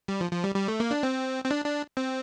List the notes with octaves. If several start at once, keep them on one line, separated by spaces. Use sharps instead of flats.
G3
F3
F3
G3
G3
A3
A#3
D4
C4
C4
D4
D4
C4